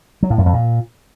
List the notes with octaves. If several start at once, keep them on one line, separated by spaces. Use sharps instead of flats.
F#3
A2
F#2
F2
A#2